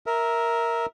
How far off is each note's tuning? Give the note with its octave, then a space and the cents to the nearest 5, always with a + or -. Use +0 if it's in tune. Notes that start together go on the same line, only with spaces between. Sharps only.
A#4 +0 E5 -15